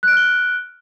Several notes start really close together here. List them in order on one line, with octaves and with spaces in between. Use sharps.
F#6 D7 F6 G7